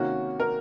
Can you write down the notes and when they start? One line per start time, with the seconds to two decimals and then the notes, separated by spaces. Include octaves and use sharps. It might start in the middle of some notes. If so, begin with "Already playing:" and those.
Already playing: C3 D#3 A#3 C#4 F#4
0.40 A#4